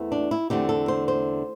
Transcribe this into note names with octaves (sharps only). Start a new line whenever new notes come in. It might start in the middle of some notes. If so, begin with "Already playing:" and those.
Already playing: E2 E3 A3 C4
D4
E4
E2 D3 A3 C4 G4
A4
C5
C5